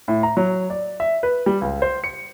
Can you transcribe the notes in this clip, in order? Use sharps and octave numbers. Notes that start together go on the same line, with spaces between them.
A2
A#5
F#3
D5
E5
B4
G3
C#2
C5
C#7